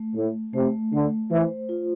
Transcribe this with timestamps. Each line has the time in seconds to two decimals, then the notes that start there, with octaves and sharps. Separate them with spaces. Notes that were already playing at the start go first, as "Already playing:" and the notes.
Already playing: A3
0.15 A2 A3
0.53 C3 A3
0.93 D3 A3
1.30 E3 C5
1.69 F4